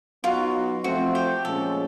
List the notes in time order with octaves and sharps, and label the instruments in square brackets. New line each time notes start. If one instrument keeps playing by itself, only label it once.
[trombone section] F#3 B3 D#4 F#4 [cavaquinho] F4
[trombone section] F3 A3 C4 [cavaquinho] F#4
[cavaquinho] G4
[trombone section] A#2 F3 G#3 C#4 [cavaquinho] A4